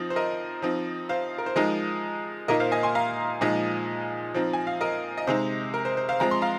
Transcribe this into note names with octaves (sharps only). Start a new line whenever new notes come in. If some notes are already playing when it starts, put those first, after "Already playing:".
Already playing: F3 C4 D#4
C5
A#4 D#5
F3 C4 D#4
C5 F5
A#4
C5
F3 G#3 D#4 A#4 D#5
A#2 A#3 D#4 A#4 D#5
C5 F5
D#5 G#5
G#5 C6
F5 A#5
A#2 F3 G#3 D#4 D#5 G#5
F3 C4 D#4
G#5
F5
A#4 D#5
D#5
C3 G#3 D#4 C5
A#4
C5
C5
C5 F5
F3 G#3 C4 A#5
C6
F5 A#5